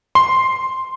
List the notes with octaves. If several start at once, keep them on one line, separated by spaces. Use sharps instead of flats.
C6